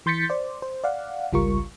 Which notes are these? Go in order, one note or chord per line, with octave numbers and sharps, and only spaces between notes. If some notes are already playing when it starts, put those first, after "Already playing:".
E3 C6 G6 A6 B6 C#7
C5 D5
C5
D5 F5 F#5
G#1 C#2 G3 F4 A#4 C#6